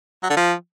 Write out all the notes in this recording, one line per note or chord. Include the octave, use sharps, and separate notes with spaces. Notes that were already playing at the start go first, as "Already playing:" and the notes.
F#3
D3
F3